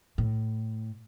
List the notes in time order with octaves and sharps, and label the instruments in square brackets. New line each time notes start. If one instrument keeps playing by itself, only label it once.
[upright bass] A2